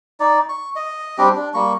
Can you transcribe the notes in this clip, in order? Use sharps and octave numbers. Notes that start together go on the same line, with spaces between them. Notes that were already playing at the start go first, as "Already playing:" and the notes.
D#4 D5
C#6
D#5
G3 C4 D4 G4
D4
G3 A#3 C#6